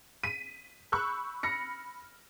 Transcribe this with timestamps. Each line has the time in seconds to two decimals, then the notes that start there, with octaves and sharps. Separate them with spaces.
0.23 B6 D#7
0.92 B5 C#6 E6 F#6 G6
1.43 B5 F6 A#6 C#7